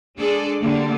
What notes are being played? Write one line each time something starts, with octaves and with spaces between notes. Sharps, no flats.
G#3 D4 G#4 A4 D5
D3 G3 A3 A#3